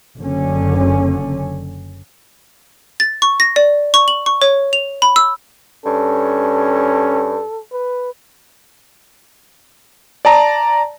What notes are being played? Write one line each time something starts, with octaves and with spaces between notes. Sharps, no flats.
F#1 D3 C#4
A6
C#6
A#6
D5
C#6
F#7
C#6
C#5
F7
B5
E6
G2 C#4 A4
B4
D5 A5 A#5